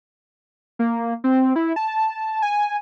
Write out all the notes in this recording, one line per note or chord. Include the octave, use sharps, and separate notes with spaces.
A#3
C4
E4
A5
G#5